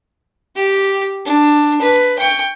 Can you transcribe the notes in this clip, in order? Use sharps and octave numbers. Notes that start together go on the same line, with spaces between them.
G4
D4
B4
G5 C#6